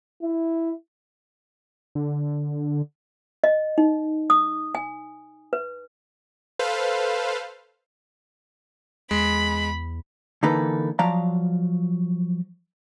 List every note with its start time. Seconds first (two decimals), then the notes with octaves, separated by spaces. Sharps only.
0.22 E4
1.95 D3
3.44 D#5
3.78 D#4
4.30 D#6
4.75 G#5
5.53 B4
6.59 A4 B4 C5 F5
9.11 E2 G#3 B5
10.43 D3 E3 A#3 D#4 A4 B4
10.99 F3 F#3 D5 F5 A#5